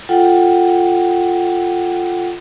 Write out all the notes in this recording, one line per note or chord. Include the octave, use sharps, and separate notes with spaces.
F4 A4 F#5 G5